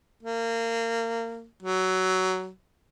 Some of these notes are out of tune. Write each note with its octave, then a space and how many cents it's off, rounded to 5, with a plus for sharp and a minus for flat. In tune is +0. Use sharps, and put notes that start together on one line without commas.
A#3 -25
F#3 +15